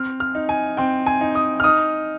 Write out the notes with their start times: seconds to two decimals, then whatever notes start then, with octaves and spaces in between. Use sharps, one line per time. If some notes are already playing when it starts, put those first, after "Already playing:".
Already playing: C4 F6
0.20 F6
0.35 D#4
0.49 G#5
0.77 C4 G5
1.06 G#5
1.21 D#4
1.35 D#6
1.60 F6
1.64 D#4 D#6